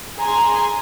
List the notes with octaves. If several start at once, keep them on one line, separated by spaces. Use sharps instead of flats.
G#4 G#5 A#5 C6